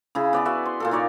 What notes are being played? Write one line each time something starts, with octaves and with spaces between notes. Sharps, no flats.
C#3 E4 G#4
B3 D5 G#5
F#4 B4 E5
C6
A#2 F4 A4
A#3 D#4 C#5 D5